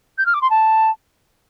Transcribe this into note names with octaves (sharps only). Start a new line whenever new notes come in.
G6
F6
D6
C6
A5